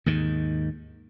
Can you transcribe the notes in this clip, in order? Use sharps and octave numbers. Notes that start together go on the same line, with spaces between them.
D#2 G#2 D#3